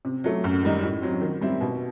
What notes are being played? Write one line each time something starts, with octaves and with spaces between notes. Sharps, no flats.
C3
F#3 A3
F#2
D#3 G3 D#4
A2
F#3 C4
D#3
G3 C4 E4
B2